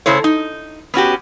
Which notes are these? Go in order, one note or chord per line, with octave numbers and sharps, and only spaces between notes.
C#3 A3 E4 C5 C#5
D#4
B3 C#4 F#4 G4